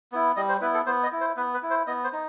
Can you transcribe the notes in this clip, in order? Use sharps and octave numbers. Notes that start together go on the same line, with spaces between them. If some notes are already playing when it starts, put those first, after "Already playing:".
B3 E4
G3 D#5
C5
B3 E4 B4
A4
B3 C5
D#5
E4
C5
B3 B4
B4
E4
C5
B3 D#5
C5
D#4